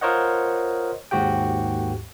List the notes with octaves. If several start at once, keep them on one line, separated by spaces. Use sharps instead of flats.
F4 A#4 C5 C#5 D#5 F#5
D#2 G#2 F#4 G4 G5